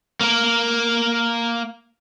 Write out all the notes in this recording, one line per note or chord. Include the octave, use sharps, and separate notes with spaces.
A#3 A#4